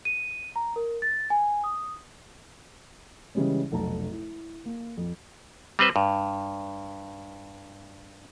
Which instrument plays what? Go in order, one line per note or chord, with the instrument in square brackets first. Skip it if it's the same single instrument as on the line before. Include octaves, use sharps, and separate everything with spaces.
[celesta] D#7
A#5
A#4
A6
G#5
D#6
[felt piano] C#3 E3 G3 G#3 C#4
F1 B1 A5 A#5
E4
A#3
F2
[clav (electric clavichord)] G3 C4 B4 C5
G2